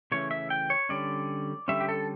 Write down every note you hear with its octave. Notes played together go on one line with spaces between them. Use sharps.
C#3 E3 A3 C#4 C#5
E5
G5
C#5
D3 G3 C#4 D5
D3 G3 C#4 E5
G4
A4